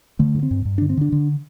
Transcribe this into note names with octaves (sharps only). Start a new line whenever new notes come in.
D3 A3
G2
C4
G2
G2
D3 D4
C4
D3 D4
D3